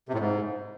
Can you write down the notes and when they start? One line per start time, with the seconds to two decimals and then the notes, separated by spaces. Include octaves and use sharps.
0.09 C3
0.14 A2
0.19 G#2